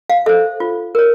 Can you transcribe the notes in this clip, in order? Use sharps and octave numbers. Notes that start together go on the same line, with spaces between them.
F5
A4 C5 E5
F4
A#4 C#5